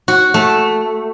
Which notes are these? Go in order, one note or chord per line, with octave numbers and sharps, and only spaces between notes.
F#4
A3